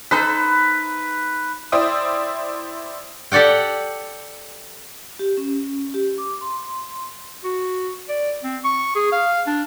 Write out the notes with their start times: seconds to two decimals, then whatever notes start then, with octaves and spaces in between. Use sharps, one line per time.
0.11 D#4 A4 B4 C5
1.72 E4 C5 D5 E5 G5 D#6
3.32 G4 A4 D5 F#5 G5
5.19 G4
5.37 C#4
5.94 G4
6.18 D6
6.41 C6
7.44 F#4
8.09 D5
8.44 C4
8.64 C#6
8.95 G#4
9.12 F5
9.47 D4